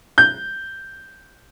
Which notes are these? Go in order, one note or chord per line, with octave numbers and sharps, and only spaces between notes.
G6